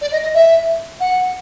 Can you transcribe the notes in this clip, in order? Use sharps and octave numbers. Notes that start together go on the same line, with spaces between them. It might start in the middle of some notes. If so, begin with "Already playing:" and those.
D5
D#5
D#5
E5
F#5